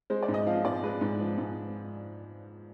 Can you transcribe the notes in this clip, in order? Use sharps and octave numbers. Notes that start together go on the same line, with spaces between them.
G#3 C5
D5
G#2
D#5
F3 F5
G#2 D5
G#3 B4
G#2
F3
G#2